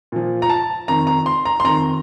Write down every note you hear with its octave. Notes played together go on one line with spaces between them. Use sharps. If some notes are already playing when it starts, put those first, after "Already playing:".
A#2 F3
A#5
A5
F2 D#3 A#5
A#5
C6
A#5
C6
F2 D#3 A#5